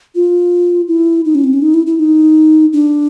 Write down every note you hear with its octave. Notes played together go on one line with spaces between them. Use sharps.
F4
E4
D#4
C#4
C4
C#4
D#4
E4
E4
D#4
D4